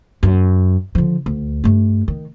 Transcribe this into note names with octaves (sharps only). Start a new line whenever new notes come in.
F#2
D3 F3
D2
G2 A3
D#3